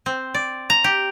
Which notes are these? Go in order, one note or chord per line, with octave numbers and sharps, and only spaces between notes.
C4
D5
A#5
G4